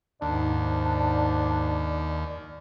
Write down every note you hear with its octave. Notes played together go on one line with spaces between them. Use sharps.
D#2 G#2 D4 D5